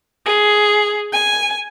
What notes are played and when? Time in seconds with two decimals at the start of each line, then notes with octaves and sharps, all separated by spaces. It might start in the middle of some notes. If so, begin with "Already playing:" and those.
0.25 G#4
1.13 G#5